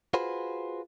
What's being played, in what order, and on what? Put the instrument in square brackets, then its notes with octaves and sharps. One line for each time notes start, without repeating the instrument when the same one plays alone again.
[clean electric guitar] F4 F#4 G#4 B4 C5